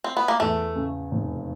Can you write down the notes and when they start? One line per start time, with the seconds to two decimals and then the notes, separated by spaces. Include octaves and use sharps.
0.04 C4
0.17 B3
0.28 A#3
0.40 E2 A3
0.76 C#3
1.12 F1